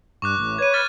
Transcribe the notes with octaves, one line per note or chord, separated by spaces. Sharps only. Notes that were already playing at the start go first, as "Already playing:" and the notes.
G2 C#6 D6 F#6
A1 A2
B4 C#5 G#6 D#7
F6 F#6 A6